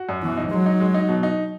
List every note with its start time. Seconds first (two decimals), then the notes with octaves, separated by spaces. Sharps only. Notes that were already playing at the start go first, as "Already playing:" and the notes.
Already playing: F#4
0.09 F#2
0.23 B2 E3
0.37 D#4
0.51 F#3 G#3
0.66 D#4
0.80 G#3
0.94 D#4
1.08 B2
1.23 D#4